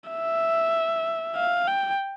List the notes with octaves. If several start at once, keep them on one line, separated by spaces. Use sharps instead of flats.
E5
F5
G5